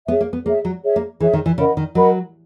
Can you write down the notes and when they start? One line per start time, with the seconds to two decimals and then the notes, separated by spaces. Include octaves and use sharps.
0.08 B3 G#4 C#5 E5
0.21 A#3
0.33 B3
0.45 A#3 G#4 C#5 E5
0.65 F#3
0.83 G#4 C#5 E5
0.96 A#3
1.21 E3 G#4 C#5 E5
1.33 D#3
1.46 E3
1.58 C#3 A#4 D#5 F#5 B5
1.77 D#3
1.95 F#3 A#4 D#5 F#5 B5